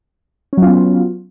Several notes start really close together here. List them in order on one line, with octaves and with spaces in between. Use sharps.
C#4 F#3 F4 B3